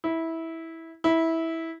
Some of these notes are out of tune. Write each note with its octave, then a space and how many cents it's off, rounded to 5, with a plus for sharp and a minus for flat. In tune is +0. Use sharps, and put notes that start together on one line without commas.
E4 -15
E4 -15